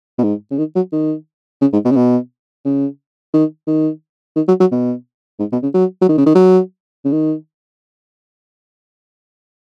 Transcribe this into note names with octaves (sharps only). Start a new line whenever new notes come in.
B2
G#2
C#3
D#3
F#3
D#3
C#3
G#2
B2
C#3
B2
C#3
D#3
D#3
D#3
F#3
F#3
B2
G#2
B2
C#3
F#3
F#3
D#3
C#3
D#3
F#3
C#3
D#3